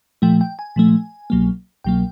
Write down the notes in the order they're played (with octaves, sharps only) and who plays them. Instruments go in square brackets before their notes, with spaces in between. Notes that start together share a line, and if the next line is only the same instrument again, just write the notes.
[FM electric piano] A#2 F3 A3 G5
G5
G#5
A#2 F3 A3
C2 B2 F#3 A#3
C2 B2 F#3 A#3 G5